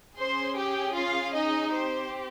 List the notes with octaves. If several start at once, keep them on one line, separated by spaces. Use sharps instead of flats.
C#4 G#4 C5 C6
G4 G5
F4 F5
D#4 D#5
C4 G4 C5